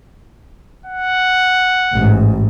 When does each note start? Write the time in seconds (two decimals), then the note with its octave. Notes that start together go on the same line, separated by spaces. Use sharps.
0.86 F#5
1.93 A1 G#2